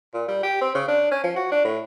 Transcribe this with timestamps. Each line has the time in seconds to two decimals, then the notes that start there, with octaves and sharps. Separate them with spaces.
0.14 A#2
0.28 G3
0.43 G4
0.61 C4
0.75 C#3
0.88 D4
1.12 C#4
1.24 F3
1.36 F#4
1.52 D4
1.65 A2